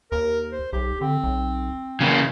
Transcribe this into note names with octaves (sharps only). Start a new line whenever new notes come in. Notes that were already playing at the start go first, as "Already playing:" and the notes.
D#2 A#4
C5
B1 G4
D3 C4
B1
C#3 E3 A#3